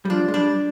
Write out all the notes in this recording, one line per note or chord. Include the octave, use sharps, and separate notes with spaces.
G3
F3 D4
G#3
G3 D4